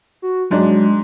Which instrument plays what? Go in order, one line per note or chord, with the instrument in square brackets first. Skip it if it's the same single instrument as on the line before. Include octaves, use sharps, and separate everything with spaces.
[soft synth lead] F#4
[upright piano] G#2 D4 [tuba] F#3 [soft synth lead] G#3